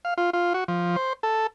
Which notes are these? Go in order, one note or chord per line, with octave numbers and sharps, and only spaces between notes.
F5
F4
F4
F#4
F3
C5
A4